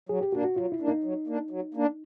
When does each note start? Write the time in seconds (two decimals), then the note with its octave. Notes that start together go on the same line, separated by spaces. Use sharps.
0.09 F#3 G#4
0.21 G4
0.32 A#3 D4 F#4
0.44 F#4
0.56 F#3 F4
0.72 E4
0.80 A#3 D4
0.88 D#4
1.04 F#3
1.27 A#3 D4
1.50 F#3
1.74 A#3 D4